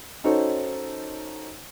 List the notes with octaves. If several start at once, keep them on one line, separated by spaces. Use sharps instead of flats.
C#4 D#4 F#4 A4 C5 C#5